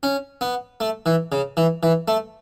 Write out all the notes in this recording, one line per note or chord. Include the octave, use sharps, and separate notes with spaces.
C#4
B3
A3
E3
C#3
E3
E3
A3